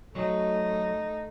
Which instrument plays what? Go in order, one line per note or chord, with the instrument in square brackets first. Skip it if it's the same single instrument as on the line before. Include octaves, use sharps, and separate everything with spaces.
[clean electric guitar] F#3 C#5 [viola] A3 [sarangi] D#4